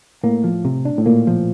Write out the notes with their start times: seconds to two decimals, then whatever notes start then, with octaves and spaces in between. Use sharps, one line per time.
0.23 A2 A#3
0.44 F3
0.65 C3
0.85 D4
0.98 A2
1.06 A#2 A#3
1.27 F3